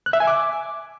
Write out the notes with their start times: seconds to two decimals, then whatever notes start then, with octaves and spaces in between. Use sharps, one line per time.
0.06 F#6
0.13 E5
0.20 G#5
0.27 D6